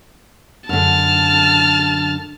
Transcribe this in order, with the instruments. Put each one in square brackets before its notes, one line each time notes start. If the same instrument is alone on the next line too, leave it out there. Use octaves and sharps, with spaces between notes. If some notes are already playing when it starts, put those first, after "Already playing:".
[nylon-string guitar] F#2 D3 [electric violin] A5 F6